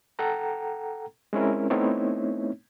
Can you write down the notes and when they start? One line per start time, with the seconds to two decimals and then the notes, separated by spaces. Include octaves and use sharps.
0.19 A4 F#5 G5 A#5
1.33 G#3 C4 C#4 E4 A#4
1.70 A3 B3 C4 D#4 E4 C#5